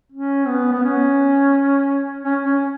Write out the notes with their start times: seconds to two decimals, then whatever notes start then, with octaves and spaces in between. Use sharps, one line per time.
0.12 C#4
0.47 B3
0.72 B3
0.83 C#4
2.25 C#4
2.45 C#4